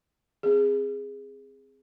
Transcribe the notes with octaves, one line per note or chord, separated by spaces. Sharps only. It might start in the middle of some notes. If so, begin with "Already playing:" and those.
C4 G#4